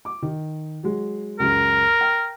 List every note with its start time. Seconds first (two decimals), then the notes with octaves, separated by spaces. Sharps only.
0.05 D6
0.22 D#3
0.83 F#3 G#3
1.40 C#2 F#2 G#3 A#4
2.01 G5